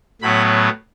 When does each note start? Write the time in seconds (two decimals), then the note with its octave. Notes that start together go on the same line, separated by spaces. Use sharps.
0.22 A2 F#3 B3 B5